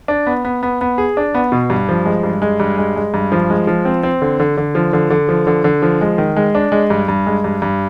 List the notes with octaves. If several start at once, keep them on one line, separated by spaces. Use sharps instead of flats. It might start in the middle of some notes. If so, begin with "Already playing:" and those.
D4
B3
B3
B3
B3
G#4
D4
B3
B2
G2
F3
G#3
G2
G#3
G2
G#3
G#3
G2
F3
G#3
F3
C4
C4
D3
D3
D3
F3
D3
D3
F3
D3
D3
F3
G#3
D#3
G#3
D4
G#3
G2
G2
G#3
G2
G2